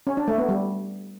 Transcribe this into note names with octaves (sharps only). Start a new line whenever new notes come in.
C#4
D4
A3
B3
G3